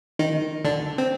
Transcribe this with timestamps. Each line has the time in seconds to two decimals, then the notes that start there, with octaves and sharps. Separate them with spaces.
0.19 D#3 D#4
0.65 D3 D4
0.98 C4